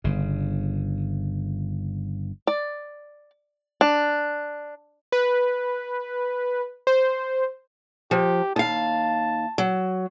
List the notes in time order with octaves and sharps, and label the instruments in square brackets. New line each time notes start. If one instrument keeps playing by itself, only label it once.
[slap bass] G1 C#3
[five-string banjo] D5
D4
[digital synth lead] B4
C5
[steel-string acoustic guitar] F3 [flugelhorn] G4
[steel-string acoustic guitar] D#2 F5 [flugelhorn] A5
[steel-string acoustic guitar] F#3